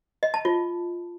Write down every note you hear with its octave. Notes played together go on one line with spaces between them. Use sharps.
D#5
A5
F4